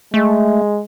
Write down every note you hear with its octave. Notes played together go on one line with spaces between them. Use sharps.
G#3 A3